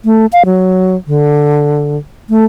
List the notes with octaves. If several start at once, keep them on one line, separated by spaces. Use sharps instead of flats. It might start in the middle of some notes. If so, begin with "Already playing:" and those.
A3
F5
F#3
D3
A3